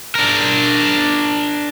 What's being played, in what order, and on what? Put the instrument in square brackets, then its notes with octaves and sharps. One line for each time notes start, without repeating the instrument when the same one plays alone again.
[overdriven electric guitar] D4 A#4